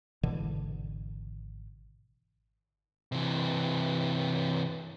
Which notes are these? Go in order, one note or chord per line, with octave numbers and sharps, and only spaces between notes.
G#1 B2 D3 E3
C3 E3